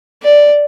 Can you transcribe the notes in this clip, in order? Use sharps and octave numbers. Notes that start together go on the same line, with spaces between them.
D5